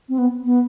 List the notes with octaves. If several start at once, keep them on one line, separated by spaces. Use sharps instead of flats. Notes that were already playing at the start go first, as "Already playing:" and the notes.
C4
B3
B3